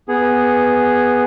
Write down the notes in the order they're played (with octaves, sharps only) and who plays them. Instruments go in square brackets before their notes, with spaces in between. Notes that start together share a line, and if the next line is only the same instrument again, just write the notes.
[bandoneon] B3 G#4